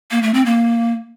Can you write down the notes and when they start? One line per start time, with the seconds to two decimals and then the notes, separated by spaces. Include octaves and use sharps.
0.11 A#3
0.23 A3
0.34 C4
0.46 A#3